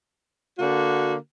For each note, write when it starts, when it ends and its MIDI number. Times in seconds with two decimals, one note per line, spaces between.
0.59 1.15 50
0.59 1.15 58
0.59 1.15 66